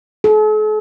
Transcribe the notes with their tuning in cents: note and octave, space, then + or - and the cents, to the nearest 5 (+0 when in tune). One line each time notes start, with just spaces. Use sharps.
A4 -45